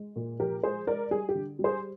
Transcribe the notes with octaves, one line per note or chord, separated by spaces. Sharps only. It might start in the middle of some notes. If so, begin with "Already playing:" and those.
Already playing: G#3
A#2
F3 G4 A#4
G#3 G#4 C5
G#3 A#4 D5
G3 G#4
G4
D3
G3
G#4 C5